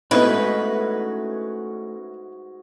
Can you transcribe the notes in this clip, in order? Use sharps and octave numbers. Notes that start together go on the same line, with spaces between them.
G#2 A3 B3 C#4 D#4 E4 F#4 B4